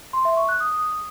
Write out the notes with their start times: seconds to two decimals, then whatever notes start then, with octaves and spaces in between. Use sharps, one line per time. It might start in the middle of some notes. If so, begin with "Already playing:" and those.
0.13 C6
0.25 E5
0.37 C#6
0.49 F#6
0.60 D#6